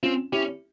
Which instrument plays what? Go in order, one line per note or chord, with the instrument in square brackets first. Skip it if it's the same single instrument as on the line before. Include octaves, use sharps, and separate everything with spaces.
[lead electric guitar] C4 [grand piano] C#4 F4
[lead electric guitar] C#4 [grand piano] E4 G4